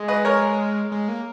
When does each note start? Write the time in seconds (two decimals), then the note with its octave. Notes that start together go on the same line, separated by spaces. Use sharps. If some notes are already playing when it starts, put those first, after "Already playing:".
Already playing: G#3
0.08 B4 D#5
0.25 A#4 C#5
0.92 G#3
1.08 A#3